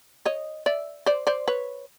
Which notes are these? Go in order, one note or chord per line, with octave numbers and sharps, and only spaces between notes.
C#5 D#5
D5 E5
C5 D5
C5 D5
B4 C#5